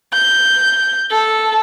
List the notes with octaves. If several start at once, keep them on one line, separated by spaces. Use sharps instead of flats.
G6
A4